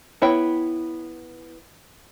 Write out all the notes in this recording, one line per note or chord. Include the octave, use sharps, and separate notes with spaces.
B3 E4 C#5 G5